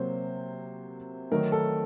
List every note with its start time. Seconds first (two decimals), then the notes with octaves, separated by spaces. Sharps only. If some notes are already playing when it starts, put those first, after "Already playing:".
Already playing: C3 F#3 A#3 C5
1.31 D#3 F#3 A3 D#4 A#4
1.52 A4